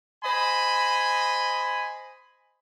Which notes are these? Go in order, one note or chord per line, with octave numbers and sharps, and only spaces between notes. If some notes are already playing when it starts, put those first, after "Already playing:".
C5 D#5 G#5 B5